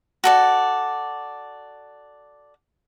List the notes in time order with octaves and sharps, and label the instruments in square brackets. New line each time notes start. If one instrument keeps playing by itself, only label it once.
[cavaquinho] F#4 A4 D5